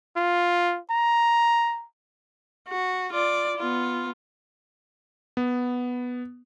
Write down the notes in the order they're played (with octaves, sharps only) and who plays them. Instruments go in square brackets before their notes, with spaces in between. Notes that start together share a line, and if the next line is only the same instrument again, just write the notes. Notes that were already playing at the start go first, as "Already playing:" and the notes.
[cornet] F4
A#5
[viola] F#4
F4 D5
B3 F4
[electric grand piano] B3